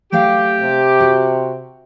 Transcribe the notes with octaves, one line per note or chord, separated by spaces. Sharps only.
F#3 A3 G4 F5
C3
F#4